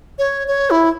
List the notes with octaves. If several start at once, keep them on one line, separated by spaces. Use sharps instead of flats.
C#5
C#5
E4